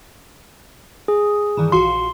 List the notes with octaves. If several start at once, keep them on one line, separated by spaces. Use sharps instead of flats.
G#4
G2 D#3 E3
A#1 F#4 F5 C6